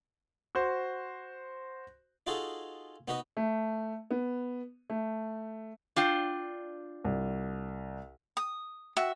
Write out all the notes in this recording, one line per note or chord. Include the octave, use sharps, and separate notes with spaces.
F#4 C5
D#4 F4 F#4 G#4 A4
B3 D#4 F#4 B4 D#5
A3
B3
A3
D4 F4 G5
C2
D#6
F#4 E5